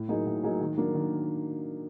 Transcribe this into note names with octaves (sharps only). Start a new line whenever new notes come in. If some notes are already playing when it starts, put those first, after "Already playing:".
Already playing: A2
F#3 A#3 D#4 G#4
A2
F#3 A#3 D#4 G#4
D#3
F#3 A#3 D4
D#3